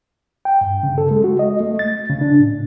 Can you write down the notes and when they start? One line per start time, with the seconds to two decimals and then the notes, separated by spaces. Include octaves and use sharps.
0.45 G5
0.61 G2
0.83 C#3
0.98 A4
1.11 G#3
1.24 F#4
1.39 D#5
1.60 A3
1.79 A6
2.10 C#3
2.21 D4
2.39 A2